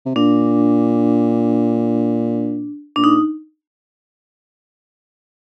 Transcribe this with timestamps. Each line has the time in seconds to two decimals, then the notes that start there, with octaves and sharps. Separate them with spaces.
0.06 C3
0.16 A#2 D4
2.96 A#2 D4
3.04 D#4